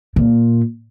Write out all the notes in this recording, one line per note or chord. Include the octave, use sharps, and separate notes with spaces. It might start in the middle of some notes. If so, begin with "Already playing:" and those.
A#2